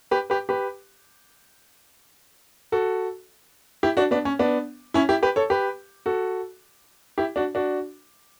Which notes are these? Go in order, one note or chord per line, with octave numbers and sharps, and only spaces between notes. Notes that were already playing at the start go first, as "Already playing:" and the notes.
G4 B4
G4 B4
G4 B4
F#4 A4
E4 G4
D4 F#4
B3 D4
C#4
B3 D4
C#4 E4
E4 G4
G4 B4
A4 C#5
G4 B4
F#4 A4
E4 G4
D4 F#4
D4 F#4